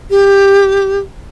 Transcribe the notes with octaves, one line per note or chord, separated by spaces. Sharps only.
G4